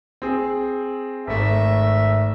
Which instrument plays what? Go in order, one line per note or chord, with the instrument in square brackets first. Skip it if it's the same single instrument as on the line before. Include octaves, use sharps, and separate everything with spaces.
[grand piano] C4 G#4
[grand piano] G#1 A3 [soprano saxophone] E5